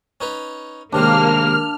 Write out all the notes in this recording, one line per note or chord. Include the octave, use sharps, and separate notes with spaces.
C#4 D#4 B4
D#2 C3 G#3 A#3 D4 F6